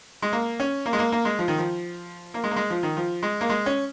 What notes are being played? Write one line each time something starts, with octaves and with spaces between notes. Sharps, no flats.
G#3
A#3
C#4
A#3
G#3
A#3
A#3
G#3
F3
D#3
F3
A#3
G#3
A#3
G#3
F3
D#3
F3
G#3
A#3
G#3
C#4